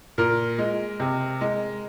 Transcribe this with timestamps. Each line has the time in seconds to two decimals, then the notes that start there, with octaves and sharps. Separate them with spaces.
0.18 A#2 A#4
0.58 G#3
1.00 C3
1.41 G#3